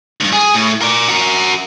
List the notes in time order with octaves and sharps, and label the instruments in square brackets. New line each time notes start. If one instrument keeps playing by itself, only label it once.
[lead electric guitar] D2 G2
G#4
A2
A#4 D5
F#4 A#4